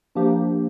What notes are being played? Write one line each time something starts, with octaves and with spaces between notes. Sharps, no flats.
F3 A#3 D4 G4